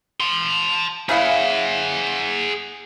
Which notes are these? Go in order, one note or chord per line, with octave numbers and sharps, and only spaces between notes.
A5 C6
C#3 E4 G#4 F5 F#5